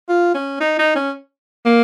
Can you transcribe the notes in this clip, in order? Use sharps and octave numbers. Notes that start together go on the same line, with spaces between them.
F4
C#4
D#4
D#4
C#4
A#3